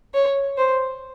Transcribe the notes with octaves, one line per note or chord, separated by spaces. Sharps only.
C#5
C5